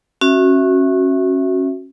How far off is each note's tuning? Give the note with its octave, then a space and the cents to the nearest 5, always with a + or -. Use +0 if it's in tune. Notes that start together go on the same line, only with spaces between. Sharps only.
C#4 -25 F#4 +0 E5 +0